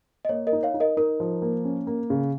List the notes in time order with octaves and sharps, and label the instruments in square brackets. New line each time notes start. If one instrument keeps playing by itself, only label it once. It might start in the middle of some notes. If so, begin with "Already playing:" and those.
[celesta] D#5
[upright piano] A#3 [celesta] C#5
[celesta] A#4 D#5
[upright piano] D#4
[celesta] C#5 F5
[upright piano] D#4
[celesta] A#4 D#5
[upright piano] D#4 [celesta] A#4
[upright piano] F3
A#3
C#4
A#3
C#3